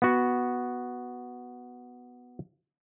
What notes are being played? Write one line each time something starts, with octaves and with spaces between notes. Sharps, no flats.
B3 F#4